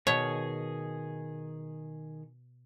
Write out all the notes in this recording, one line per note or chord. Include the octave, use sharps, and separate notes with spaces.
B2 D#3 G#4 C#5 F6